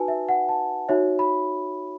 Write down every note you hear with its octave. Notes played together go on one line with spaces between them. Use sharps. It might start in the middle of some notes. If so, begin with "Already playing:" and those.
Already playing: D#4 F#4 B4 G#5 A5
E5
F#5
A5
D#4 F#4 C#5 E5
B5